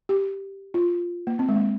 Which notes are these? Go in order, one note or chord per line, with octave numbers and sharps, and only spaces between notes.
G4
F4
A#3
C4
G#3
A#3